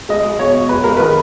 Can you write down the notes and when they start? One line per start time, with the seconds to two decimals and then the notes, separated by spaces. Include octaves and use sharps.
0.09 G#3 D#5
0.25 G#3
0.39 B2 C#5
0.54 B2
0.69 G#3 B4
0.84 G#3 A#4
0.97 D#3 B4